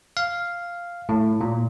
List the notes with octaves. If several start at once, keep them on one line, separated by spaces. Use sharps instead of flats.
F5
A2
A#2